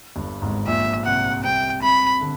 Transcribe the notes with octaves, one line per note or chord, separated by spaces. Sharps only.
G1 G2
G#1 G#2
A#1 A#2 E5
C2 C3 F#5
C2 C3 G5
C2 C3 B5
D3